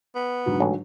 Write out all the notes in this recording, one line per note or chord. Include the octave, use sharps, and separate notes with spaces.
B3
G#2 D3 F#3
A1